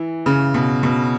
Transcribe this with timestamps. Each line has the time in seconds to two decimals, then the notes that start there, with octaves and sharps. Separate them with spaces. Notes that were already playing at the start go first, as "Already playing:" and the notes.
Already playing: E3
0.26 C#3
0.54 B2
0.83 B2